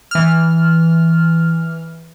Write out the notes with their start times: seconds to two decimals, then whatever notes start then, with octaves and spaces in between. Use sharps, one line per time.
0.11 E3 F6